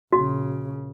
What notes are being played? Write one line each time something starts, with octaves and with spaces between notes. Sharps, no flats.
A#1 C#3 F#4